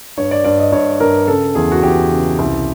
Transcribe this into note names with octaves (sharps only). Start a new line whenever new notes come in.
G2 C#5
D5
G2 D5
D#5
G2 C#5
G2 A#4
C#3 A4
E2 G#4
F#4
E2 G4
C#3
C2